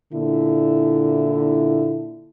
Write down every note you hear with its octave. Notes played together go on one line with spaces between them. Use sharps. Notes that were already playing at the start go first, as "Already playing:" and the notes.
A#2 D3 E4